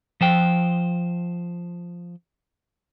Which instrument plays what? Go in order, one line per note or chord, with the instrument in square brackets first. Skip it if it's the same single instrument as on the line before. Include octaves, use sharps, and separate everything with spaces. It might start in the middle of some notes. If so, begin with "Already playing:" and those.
[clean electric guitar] F3 C5 G5